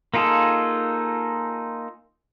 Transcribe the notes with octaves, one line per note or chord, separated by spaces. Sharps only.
A#3 D#4 F4 G#4 A4